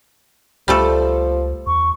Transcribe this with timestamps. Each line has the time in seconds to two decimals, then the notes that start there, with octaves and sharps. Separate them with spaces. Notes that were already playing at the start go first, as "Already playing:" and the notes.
0.68 C#2 F3 G3 A3 A4
1.67 E2 C#6